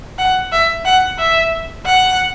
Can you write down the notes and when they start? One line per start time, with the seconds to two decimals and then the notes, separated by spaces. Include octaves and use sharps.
0.18 F#5
0.52 E5
0.85 F#5
1.19 E5
1.86 F#5